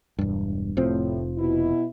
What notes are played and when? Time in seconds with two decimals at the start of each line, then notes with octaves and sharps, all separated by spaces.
0.19 E1 G2
0.77 F1 A2 F3 C4
1.37 B2 E4